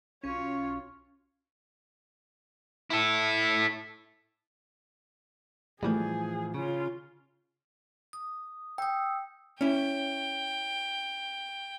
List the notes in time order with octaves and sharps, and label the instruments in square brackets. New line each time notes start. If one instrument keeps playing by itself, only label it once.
[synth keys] B1 C#4 [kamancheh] F4 C#5
[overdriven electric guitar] E4 A4
[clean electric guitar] A2 E3 F3 [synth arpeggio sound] G3 A3 [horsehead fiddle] G#4
[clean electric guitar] C#3 [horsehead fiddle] C#4 F4
[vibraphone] D#6
[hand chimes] G5 [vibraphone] D#6 E6
[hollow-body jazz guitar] C#4 E4 [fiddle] G5